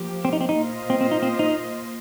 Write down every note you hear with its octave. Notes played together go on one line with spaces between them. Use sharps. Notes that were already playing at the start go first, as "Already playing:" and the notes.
Already playing: F3 A#3 G4
C4
D#4
C4
D#4
A#2 A#3 F4 C5 D#5
C4
C4
D#4
C4
D#4